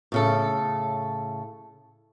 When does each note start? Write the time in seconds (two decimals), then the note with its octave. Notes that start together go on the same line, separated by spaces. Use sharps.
0.12 A2 C#3 A4